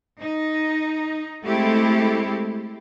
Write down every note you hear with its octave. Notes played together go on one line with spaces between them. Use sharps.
D#4
G#3 A3 C4 E4 G4 A4